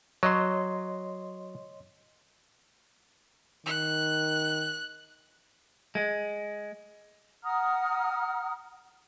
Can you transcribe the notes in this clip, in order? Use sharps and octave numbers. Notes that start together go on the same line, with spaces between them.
F#3 C#5 D#5 C6
D#3 F#6
G#3
F#5 A#5 D#6 F6